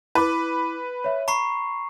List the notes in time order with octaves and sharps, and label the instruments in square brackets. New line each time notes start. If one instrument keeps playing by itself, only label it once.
[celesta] E4 D6 [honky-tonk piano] B4
[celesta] C#5 E5
[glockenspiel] A#5 C#6 C7 [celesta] B5